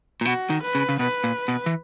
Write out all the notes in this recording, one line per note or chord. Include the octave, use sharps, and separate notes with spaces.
A#2
B2 F#4
D#3
B4
C#3
C#3
B2 B4
A#2
B2
E3